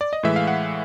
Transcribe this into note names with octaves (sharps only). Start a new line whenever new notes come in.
D5
D#5
A2 E3 G#3 E5
F5
F#5